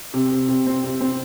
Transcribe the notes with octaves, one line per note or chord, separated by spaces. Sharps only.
C3
C3
C3
C4
C3
C4